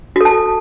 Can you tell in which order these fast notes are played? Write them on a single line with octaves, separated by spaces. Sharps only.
F#4 A4 A5